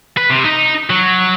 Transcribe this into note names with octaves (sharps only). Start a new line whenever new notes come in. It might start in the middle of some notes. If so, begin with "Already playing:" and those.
B4
C3
D#4
F#3